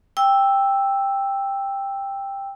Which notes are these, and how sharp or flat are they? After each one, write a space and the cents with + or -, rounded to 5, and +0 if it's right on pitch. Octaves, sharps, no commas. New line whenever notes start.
G5 +10 E6 +0